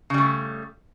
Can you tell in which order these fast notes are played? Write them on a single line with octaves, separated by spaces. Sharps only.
C#3 G3 A3